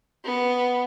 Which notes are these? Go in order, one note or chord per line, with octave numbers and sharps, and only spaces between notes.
B3